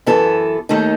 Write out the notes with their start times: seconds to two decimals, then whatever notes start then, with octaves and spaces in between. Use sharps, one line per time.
0.06 F#2 E3 B3 E4 A4
0.69 D#2 D#3 A3 D#4 A4